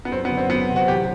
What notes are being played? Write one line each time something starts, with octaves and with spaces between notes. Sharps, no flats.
B3
F#2 C4
B3
D3
C4
B3 D4
C3
F#4
A1 G4